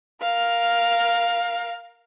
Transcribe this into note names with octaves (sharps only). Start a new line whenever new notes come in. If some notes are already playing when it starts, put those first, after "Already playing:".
A#4 F5